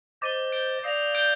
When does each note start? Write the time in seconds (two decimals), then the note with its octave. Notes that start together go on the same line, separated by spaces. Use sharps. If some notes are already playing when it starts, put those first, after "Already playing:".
0.22 C5 D#5 D6 A6 D#7 G7
0.52 G6 D7 G7
0.83 D5 F5 D#6 A#6 F7
1.15 G6 D7 G7